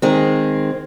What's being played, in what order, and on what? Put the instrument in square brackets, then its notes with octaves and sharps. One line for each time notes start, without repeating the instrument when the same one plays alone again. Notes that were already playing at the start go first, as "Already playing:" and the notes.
[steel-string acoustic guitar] D#3 G#3 C4